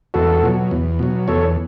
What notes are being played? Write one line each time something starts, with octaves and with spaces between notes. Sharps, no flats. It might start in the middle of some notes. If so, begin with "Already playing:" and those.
E2 F#4 A4
B2 F#3
E2
B2 F#3
E2 A4 C#5